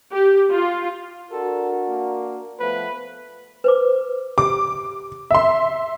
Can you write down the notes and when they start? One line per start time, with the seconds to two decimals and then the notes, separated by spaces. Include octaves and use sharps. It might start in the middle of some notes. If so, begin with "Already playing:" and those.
0.12 G4
0.52 F4
1.32 D4 F#4 A4 A#4
1.87 A#3
2.60 F3 A3 B3 B4
3.64 B4 C5 D6
4.38 G4 D6
5.31 E5 C6